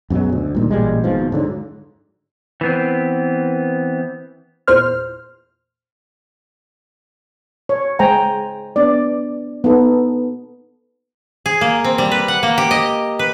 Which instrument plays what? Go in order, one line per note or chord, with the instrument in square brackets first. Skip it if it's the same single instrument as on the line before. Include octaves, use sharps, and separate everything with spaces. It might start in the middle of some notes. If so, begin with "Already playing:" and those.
[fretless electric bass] F#2 B2 F#3 G#3
D2
G2 A#2 D#3
A1 A#2 G3 G#3
G#1 G#2 B2 F3
G#2 D3 F3 F#3
[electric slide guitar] E3 B3 C4
[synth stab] E2 A#2 C5 F6
[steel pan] C#5
G#3 C5 G5 G#5 A#5
B3 D4 D5
B3 D#4 A4
[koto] G#4
A#3
C4
G3
B4
F#5
A#3
G4
D#5
B4